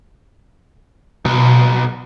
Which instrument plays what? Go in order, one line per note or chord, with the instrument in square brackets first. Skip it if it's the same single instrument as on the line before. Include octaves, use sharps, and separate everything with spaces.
[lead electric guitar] B1 [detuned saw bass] B2